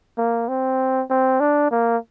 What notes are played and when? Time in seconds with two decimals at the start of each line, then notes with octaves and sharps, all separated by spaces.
0.18 A#3
0.48 C4
1.10 C4
1.40 D4
1.71 A#3